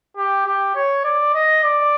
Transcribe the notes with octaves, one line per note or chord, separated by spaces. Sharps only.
G4
G4
C#5
D5
D#5
D5